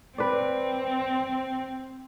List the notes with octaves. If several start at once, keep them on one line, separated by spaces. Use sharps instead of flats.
C4 B4 D5